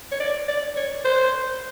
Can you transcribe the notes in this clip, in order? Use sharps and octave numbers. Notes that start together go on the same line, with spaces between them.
C#5
D5
D5
C#5
C5